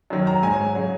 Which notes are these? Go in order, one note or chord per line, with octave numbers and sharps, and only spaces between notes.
F#2 D#3 F#3
A#5
G#2 F#3 G#5
C#3 F#3